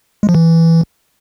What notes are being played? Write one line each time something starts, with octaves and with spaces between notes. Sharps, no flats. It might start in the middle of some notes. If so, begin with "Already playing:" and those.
G#3
F3
E3